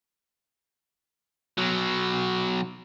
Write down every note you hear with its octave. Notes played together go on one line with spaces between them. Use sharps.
B2 F#3